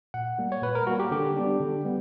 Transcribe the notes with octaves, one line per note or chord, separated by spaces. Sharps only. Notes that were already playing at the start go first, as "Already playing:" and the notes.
A#2 F#5
G3 A#3
C#5
A#2 B4
A#4
G3 A#3 F#4
G4
D3 G4
G3 B3 D4
D3
G3 B3